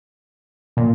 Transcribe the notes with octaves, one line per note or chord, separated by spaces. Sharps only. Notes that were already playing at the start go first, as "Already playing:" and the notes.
A#2